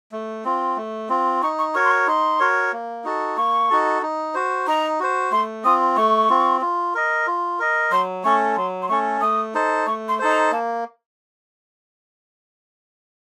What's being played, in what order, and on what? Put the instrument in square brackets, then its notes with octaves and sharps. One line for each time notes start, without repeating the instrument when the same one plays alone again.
[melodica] A3
C4 F4
A3
C4 F4
[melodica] D#4 [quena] C#6
[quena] C#6
[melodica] F#4 A#4 C#5 [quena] C#6
[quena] C6
C#6
[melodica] D#4 [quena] C6
[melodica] F#4 A#4 C#5
A#3
D#4 F#4 A4
[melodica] A#3 [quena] C#6
[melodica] D#4 F#4 A4
D#4
F#4 C5
[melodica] D#4 [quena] A#5
[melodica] F#4 C5
[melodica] A3 [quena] C6
[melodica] C4 F4 [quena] D#6
[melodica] A3 [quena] C#6
[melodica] C4 F4
F4
A#4 D#5
F4
A#4 D#5
[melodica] F#3 [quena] C6
[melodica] A3 C#4 A4 [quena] C#6
[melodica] F#3 [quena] C6
[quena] C6
[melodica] A3 C#4 A4 [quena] C#6
[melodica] A3 [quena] D#6
[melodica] D#4 A4 C5
[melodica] A3 [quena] C#6
[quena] C6
[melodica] D#4 A4 C5
[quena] A#5
[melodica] A#3 [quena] A5